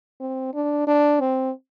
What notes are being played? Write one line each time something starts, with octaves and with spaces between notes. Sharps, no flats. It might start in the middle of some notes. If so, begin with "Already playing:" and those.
C4
D4
D4
C4